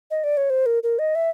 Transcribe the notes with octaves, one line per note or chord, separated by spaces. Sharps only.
D#5
D5
C#5
C5
A#4
A#4
D#5
E5